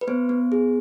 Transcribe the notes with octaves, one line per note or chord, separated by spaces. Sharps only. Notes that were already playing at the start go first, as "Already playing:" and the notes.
B4
B3 C5
B3
G#4